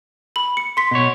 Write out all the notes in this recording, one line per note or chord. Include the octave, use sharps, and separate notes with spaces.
B5 F#7
C#7
C6 B6
B2 C#5